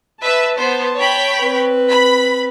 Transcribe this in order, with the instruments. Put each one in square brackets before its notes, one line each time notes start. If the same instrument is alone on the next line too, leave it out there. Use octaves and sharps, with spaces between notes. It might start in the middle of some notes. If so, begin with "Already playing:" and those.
[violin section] B4 E5 [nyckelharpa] A5
[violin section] B3 C5
C#5 G5 B5
[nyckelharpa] C4 B4
[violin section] B5